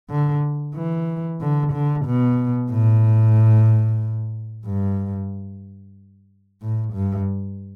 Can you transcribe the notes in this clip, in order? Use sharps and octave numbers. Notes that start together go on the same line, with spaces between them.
D3
E3
D3
D3
B2
A2
G2
A2
G2